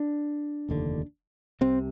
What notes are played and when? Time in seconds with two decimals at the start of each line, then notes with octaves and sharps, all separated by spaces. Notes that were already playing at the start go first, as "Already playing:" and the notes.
Already playing: D4
0.69 F1 D#2 D3
1.61 C2 C3 C4